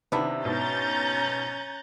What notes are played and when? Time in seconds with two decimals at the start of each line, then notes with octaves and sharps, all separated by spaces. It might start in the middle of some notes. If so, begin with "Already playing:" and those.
0.12 C3 D#3 B3 D4 E4
0.45 G#2 B2 C#4 A#5 G6 A6